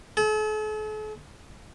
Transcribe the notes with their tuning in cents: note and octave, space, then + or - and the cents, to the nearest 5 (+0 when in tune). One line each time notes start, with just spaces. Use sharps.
A4 -45